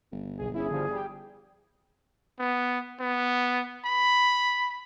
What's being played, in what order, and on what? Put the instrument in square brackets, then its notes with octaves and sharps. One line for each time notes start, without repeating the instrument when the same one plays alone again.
[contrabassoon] G1
[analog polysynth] B1 G#4
[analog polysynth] C#4 E4 [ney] G#4
[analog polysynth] D3 F3 G3
G3 G4
[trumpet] B3
B3
B5